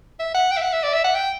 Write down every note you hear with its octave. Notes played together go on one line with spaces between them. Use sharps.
E5
F#5
G5
E5
F#5
E5
D5
E5
F#5
G5